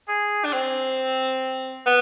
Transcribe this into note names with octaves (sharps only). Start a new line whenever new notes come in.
G#4
D4
C4
B3